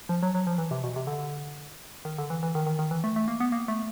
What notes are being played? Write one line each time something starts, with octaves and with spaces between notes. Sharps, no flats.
F3
F#3
F#3
F3
E3
C3
B2
C3
D3
D#3
D3
E3
E3
D#3
D#3
D#3
E3
A3
A3
A#3
B3
A#3
A3